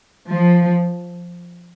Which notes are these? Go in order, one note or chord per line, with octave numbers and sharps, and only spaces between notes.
F3